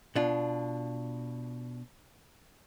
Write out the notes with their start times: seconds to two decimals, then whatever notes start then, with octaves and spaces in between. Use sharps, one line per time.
0.15 B2 D4 F4